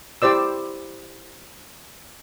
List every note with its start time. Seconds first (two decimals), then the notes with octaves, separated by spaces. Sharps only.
0.22 E4 G4 C5 D5 E6